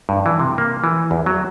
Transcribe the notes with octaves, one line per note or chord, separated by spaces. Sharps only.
G2
E3
C3
A#3
E3
E2
F#3